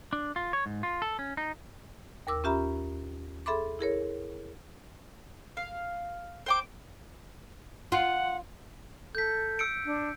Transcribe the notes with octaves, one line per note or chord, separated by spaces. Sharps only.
D4
F4
C#5
G#2
F4
A4
C#4
D#4
D#2 A#4 D6 E6
C#4 F4 G4 E5 A#5 B5
G#4 A4 E5 B5 C6 D6
E4 G#4 A#4 C#5
F5
C5 G5 D6
F4 F#5
A4 G6 B6
E6 C#7 D7
D4